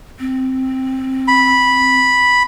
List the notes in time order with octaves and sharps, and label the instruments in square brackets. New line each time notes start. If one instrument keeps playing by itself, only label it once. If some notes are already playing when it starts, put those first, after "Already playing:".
[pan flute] C4
[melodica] B5